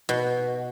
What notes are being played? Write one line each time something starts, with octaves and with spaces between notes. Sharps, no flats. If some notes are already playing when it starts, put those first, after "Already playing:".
B2